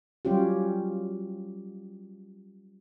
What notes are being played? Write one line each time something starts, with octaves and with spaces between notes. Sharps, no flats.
F#3 G3 C#4 F4 G4